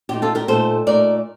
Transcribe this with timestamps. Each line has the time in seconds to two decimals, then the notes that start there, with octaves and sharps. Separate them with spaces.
0.09 A#2 A3 D#4 G4
0.22 F4 A4
0.35 G4 A#4
0.48 A#2 A3 D#4 A4 C5
0.87 A#2 A3 D#4 A#4 D5